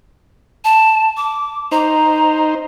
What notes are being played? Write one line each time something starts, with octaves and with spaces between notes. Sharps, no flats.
A5
D6
D#4 C5 A#5